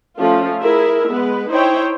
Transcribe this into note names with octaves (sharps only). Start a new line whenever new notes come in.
F3 A3 C#4 F4
E4 G#4 A#4 E5
G#3 B3 B4
D#4 E4 C5 C#5 G5